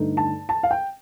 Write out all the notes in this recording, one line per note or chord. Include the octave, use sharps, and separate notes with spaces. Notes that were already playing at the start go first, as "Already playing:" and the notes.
Already playing: G2 D3 A3 D#4
A5
A5
F5
G5